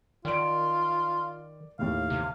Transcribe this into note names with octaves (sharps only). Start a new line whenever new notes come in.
D#3 F4 D5 D7
D#2 A2 F5
C3